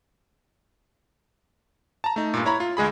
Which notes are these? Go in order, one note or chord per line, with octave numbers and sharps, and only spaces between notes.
A5 A#5
A3 D#4
G2 A#2
E4 C#5 A#5 B5
F4
D2 G#3 G#4 B5